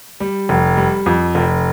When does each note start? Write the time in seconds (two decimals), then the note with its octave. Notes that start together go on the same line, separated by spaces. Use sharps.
0.20 G3
0.49 F1
0.77 G3
1.06 F2
1.35 F1